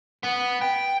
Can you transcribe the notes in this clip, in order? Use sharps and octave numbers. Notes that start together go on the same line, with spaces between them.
B3
G5